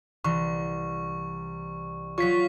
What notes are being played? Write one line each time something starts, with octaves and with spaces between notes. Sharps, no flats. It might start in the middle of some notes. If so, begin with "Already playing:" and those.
C2 E3 C#6
F#3 F4 C#5 C#6 B6